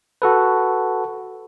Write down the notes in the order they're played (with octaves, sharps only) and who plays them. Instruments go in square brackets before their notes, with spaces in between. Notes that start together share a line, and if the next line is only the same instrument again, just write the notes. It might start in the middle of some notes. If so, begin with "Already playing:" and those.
[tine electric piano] F#4 A4 B4